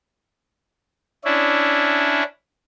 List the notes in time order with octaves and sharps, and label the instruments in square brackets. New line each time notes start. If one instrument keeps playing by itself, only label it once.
[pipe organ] C#4 D4 E4